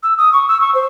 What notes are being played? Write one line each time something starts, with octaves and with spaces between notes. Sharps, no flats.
E6
D#6
C#6
E6
C#6
C5